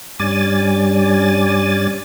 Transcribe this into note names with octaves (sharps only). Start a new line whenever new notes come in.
G2 G3 C#4 D5 G#5 A6